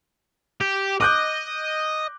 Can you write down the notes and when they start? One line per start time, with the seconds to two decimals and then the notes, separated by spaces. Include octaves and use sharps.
0.61 G4
1.01 D#5 D6 F#6 G6